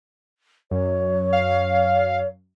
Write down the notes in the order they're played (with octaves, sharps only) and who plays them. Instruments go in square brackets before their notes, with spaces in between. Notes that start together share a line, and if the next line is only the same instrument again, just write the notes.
[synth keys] F#2 [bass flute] C#5
[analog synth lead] F5